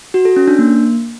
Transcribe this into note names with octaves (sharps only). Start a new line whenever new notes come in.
F#4
A4
C#4
D4
A#3